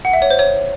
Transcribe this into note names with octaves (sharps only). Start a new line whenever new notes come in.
F#5
E5
C#5
C5
C#5